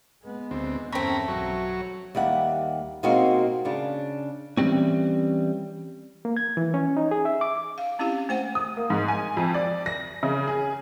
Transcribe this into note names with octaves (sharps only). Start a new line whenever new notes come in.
G#3 B3
D2 C4
E2 G2 A3 C4 C#4 A#5 B5
B1 F#3 C#5
D#2 G3 E5 F#5
B2 G#3 A#3 C4 D#4 F#4
C#3 D4
E3 F#3 G3 C4 C#4
A#3
G#6
E3
C#4
D#4
G#4
E5
D6
F5
C4 C#4 E4 G4 F5
A3 C5 F#5
D#6
A#3
G#2
G#5
F2
D5
A#6
C#3
G#4